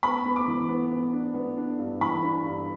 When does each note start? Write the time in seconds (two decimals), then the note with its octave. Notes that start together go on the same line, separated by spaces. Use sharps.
0.03 B3 B5
0.26 B3
0.36 D6
0.48 E3
0.69 B3
0.91 B3
1.13 D4
1.34 B3
1.57 D4
1.79 G2
2.01 E3 B5
2.23 D4
2.45 G2